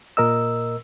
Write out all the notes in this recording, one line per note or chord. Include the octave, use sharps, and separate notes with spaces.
A#2 A#4 D#5 E6